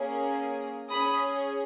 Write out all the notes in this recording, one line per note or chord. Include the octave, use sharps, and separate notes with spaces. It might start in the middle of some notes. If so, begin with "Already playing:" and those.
Already playing: A#3 C#4 G#4
C#4 G#4 B5 D#6